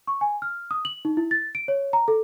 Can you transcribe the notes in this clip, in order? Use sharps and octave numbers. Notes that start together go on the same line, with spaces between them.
C#6
G#5
F6
D#6
F#7
D#4
E4
A6
D7
C#5
A#5
A4